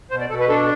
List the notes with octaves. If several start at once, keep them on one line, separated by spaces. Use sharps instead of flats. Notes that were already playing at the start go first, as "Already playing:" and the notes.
B2 C5
D5
B2 A4
B4
D4 A4